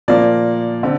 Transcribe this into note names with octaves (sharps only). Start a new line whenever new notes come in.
A#2 F3 A#3 D5
D3 C4